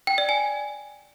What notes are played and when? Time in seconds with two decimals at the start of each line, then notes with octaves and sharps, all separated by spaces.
0.07 G5
0.18 D5
0.29 G#5